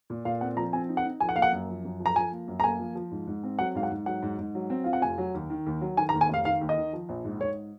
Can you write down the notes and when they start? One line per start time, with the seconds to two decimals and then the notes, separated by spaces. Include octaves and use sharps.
0.10 A#2
0.25 A#2 F5
0.41 C4 F#5
0.57 F3 A#5
0.73 C4 G#5
0.89 D#4
0.97 F#5
1.05 D#4
1.20 F3 G#5
1.29 F#5
1.36 A#3 F5
1.42 F#5
1.52 F#2
1.69 F3
1.85 F#2
2.00 F3
2.06 A#5
2.16 F3 G#5
2.32 A#3
2.48 F#2
2.60 A#5
2.64 A#3 G#5
2.79 F3
2.95 F3
3.11 G#2
3.27 G#2
3.43 C4
3.59 F#3 F#5
3.75 G#2 F5
3.83 F#5
3.91 G#2
4.06 F#3 F#5
4.22 G#2
4.38 G#2
4.55 F#3
4.70 C4
4.84 F4 F5
4.93 F#5
5.02 F1 G#5
5.18 F#3
5.34 D#2
5.50 D#3
5.66 D#2
5.81 F#3
5.97 D#3 G#5
6.09 A#5
6.14 D#2
6.21 G#5
6.29 F1 F5
6.45 D#3 F5
6.61 D#2
6.69 D#5
6.77 D#3
6.93 F3
7.09 A#1
7.25 G#2
7.41 G#2 C#5